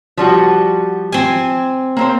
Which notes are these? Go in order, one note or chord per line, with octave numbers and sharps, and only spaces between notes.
F3 G3 F#4
C4 G#5
A#3 C4 C5